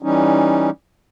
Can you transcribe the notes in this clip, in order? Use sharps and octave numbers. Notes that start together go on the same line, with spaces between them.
E3 G3 C#4 D#4